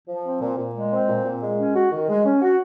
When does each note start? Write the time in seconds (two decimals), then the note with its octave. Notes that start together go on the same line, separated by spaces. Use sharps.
0.08 F3
0.24 C4
0.42 A#2
0.58 A#2
0.75 G#3
0.91 C4
1.09 A#2
1.25 A#2
1.42 G#3
1.58 C#4
1.75 F#4
1.92 D#3
2.09 G#3
2.25 C#4
2.42 F#4